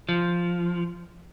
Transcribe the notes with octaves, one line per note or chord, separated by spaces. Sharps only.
F3